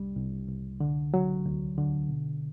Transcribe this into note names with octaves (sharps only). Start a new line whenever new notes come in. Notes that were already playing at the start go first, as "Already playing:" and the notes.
Already playing: C2 G3
C2
C2
D3
F#3
D2
D3
B2